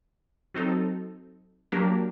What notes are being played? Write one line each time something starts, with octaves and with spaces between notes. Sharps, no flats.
F#3 C4 D#4 A4
F#3 A#3 D4 G4 A#4